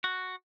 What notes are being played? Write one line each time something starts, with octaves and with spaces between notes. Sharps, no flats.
F#4